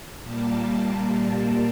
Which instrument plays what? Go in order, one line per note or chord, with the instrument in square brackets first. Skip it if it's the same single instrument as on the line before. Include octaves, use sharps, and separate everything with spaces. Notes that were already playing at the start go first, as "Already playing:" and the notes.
[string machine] A#2 G3 A#3 A5